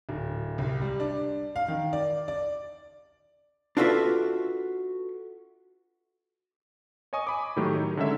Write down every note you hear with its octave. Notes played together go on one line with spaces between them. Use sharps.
D1
C2
G3
D4
F5
D#3
D5
D5
D4 F4 F#4 A4 B4 E5
C#5 D#5 G#5 C#6 D#6
B5 D6
A2 D#3 F#3 A3 G4
D#4 C#5
D3 G#3 C#4 D#4 E5